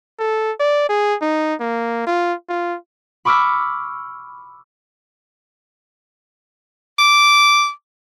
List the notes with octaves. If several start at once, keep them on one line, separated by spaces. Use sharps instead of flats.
A4
D5
G#4
D#4
A#3
F4
F4
B5 C#6 D6 E6 F6 B6
D6